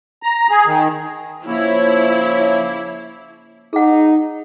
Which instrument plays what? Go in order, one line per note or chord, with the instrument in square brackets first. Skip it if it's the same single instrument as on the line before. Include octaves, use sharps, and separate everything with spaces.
[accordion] A#5
G#4
D#3
[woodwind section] C#3 A#3 [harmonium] F3 C#5 [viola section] E4
[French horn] D#4 [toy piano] G#4 F#5